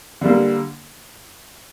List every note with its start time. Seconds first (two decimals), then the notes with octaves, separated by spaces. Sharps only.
0.21 D3 G3 A#3